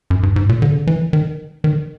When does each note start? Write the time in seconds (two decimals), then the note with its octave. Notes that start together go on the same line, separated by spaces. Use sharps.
0.10 F#2
0.23 G2
0.36 G#2
0.49 A#2
0.62 D3
0.70 C#3
0.78 D3
0.87 E3
1.13 D#3
1.64 D#3